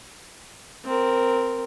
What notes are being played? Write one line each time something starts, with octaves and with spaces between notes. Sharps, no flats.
C4 A#4